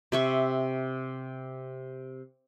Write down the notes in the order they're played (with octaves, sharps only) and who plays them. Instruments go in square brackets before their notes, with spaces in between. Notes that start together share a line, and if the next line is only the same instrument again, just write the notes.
[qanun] C3 E5 C#6